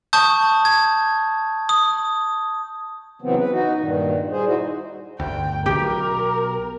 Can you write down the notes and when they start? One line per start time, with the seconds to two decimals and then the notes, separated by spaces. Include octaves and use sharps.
0.13 A5 C#6 D#6 G6
0.65 G#6
1.69 D#6
3.22 C#3 E3 F#3 B3 C4
3.38 B4
3.52 D#4 F#4
3.78 G2 A#2 D#3
4.31 G3 G#4 C5
4.47 D#4 E4 F#4 C5
5.20 G1 D2 G5
5.66 B1 B2 G4 A#4